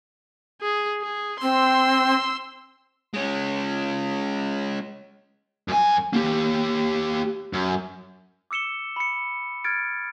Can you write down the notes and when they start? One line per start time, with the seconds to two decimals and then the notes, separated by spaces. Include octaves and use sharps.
0.61 G#4
1.02 G#4
1.42 C4 C6 E6
3.14 G#3 C#4
5.68 F#2 G#5
6.13 A#3 G4
7.53 F#2
8.51 D6 E6 C#7 E7 G7
8.96 B5 C#7
9.64 F6 G#6 A6 D7